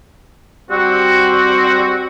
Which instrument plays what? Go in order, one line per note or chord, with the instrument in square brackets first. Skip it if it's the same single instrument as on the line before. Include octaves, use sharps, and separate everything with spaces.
[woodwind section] G3 C4 F#4